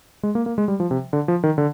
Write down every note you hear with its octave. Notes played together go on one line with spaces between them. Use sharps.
G#3
A#3
A#3
G#3
G3
F3
C3
D3
F3
D#3
D3